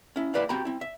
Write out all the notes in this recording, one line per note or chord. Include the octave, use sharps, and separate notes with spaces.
C#4 E4
A#3 E4 G4 B4 D5 F5
C4 F#4 G4 A#5 B5
C4 E4
E5